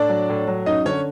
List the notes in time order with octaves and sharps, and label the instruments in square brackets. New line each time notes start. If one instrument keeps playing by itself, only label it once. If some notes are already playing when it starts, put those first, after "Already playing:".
Already playing: [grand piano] A2 D4 D5
F#3
A2
F#3
F#2 D#4 D#5
D3 C#4 C#5